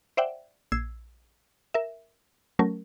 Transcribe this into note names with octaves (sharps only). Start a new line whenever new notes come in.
C5 D5 E5 F#5 G5
A#1 E6 G#6 C7
A#4 E5
F#3 A3 C#4 A#4